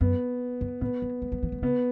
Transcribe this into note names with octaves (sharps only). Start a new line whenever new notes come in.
F#2 B3
F#2
A2 B3
F#3
G#3
F#3
E3
F#3
C#3 B3